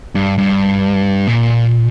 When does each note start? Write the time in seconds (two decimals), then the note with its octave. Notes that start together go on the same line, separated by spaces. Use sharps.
0.15 G2
0.38 G2
1.27 A#2